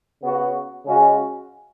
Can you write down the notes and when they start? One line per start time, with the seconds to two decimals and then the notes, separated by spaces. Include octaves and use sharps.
0.21 C#3 B3 F#4
0.84 C#3 G#3 C#4 F#4